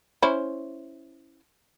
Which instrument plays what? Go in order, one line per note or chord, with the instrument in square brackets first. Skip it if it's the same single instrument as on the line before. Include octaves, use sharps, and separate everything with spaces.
[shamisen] C#4 E4 C5